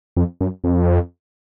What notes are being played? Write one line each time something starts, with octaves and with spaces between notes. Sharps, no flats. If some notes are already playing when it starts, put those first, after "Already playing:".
F2
F#2
F2